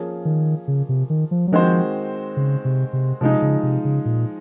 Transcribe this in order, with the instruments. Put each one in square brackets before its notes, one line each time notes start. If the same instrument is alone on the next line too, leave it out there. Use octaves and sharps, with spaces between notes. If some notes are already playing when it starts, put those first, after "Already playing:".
Already playing: [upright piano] F3 A#3 C#4 G#4
[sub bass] D#3
C#3
C3
D#3
F3
F#3
[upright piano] D#3 G#3 C4 F#4 C5 [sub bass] F3
[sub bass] C#3
C3
C3
[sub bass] C3 [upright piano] F3 G#3 D#4
[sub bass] C#3
C3
C#3
A#2